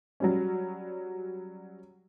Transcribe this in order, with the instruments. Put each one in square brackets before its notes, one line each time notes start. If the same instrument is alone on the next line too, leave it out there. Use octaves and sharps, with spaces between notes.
[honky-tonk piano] F#3 G3 C#4